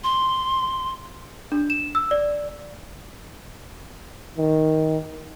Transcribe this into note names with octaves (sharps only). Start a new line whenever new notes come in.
C6
D4
E7
E6
D5
D#3